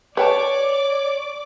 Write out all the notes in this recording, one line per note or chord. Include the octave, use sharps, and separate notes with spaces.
B4 C#5 D5 G5 A5 D6